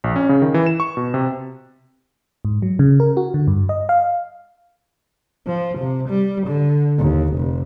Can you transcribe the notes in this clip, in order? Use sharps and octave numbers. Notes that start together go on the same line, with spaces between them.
A#1
C#4
C#3
D#3
E3
E7
C#6
B2
C3
G#2
F#3
C#3
A#4
F#4
D3
G2
D#5
F5
F3
C3
G3
D3
D#2
F1